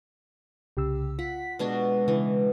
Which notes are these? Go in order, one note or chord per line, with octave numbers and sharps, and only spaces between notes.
C2 C#3 G4 E6
F4 F#5 B6
B2 G#3 D4 F#4
C#3 E3